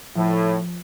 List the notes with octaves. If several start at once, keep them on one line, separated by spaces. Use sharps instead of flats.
A2 F3